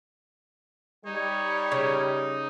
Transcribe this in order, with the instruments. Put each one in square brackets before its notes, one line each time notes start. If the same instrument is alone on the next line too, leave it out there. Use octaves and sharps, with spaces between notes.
[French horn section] G3 [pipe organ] D#4 [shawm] C#5
[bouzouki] C#3